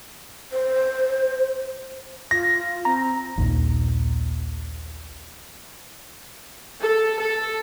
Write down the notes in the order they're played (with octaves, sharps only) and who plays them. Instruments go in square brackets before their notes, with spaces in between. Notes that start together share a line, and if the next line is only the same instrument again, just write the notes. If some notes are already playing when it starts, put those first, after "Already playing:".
[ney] C5
[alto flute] F4 [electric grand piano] A#6
[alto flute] C4 [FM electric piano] A#5
[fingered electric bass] A#1 D#2 A#2 D#3
[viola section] A4
A4